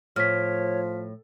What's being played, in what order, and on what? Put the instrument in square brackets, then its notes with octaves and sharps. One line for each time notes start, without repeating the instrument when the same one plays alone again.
[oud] A2 [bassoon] F3 [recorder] C#5 [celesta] F6 B6